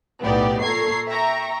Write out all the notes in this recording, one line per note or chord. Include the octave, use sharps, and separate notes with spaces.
B1 A2 B3 D#4 G4 D5
A#2 A4 A#5 C#6 G#6 C7
E5 G5 A#5 C#6